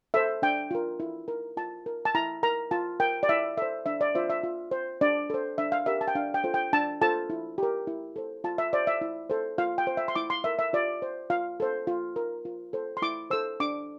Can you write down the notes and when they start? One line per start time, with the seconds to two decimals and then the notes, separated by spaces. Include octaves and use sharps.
0.14 A4 C5 E5
0.42 D4 G5
0.71 F4 A#4
1.00 E4
1.28 A#4
1.57 F4 A5
1.86 A#4
2.05 A5
2.15 E4 A#5
2.43 A#4 A#5
2.71 F4 A5
3.00 A#4 G5
3.23 D5
3.29 E4 E5
3.57 A4 C5 E5
3.86 D4 E5
4.01 D5
4.15 F4 C5 E5
4.30 E5
4.43 F4
4.71 C5
5.01 D4 D5
5.30 A4 C5
5.58 D4 E5
5.72 F5
5.86 G4 A#4 E5
6.01 A5
6.08 G5
6.15 D4 F5
6.34 G5
6.44 F4 A4 C5
6.54 G5
6.73 D4 A5
7.01 F4 A4 C5 A5
7.30 E4
7.58 G4 A#4
7.87 E4
8.16 A4 C5
8.44 F4 A5
8.58 E5
8.73 C5 D5
8.87 E5
9.01 E4
9.30 A4 C5
9.58 F4 F5
9.78 G5
9.87 C5
9.97 E5
10.08 C6
10.15 E4 D6
10.30 C6
10.44 A#4 E5
10.59 E5
10.73 F4 D5
11.02 C5
11.30 F4 F5
11.60 A4 C5
11.87 F4
12.16 A#4
12.45 F4
12.73 A4 C5
12.97 C6
13.02 E4 D6
13.30 A4 C5 E6
13.60 D4 D6